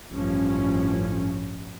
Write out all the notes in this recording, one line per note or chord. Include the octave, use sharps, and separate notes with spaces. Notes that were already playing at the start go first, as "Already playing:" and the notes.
A1 G2 F3 C#4